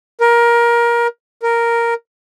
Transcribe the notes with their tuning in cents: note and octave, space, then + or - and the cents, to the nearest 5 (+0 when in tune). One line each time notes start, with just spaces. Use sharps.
A#4 +20
A#4 +0